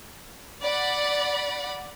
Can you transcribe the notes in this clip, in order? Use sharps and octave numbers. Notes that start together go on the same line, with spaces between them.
D5 F#5 B5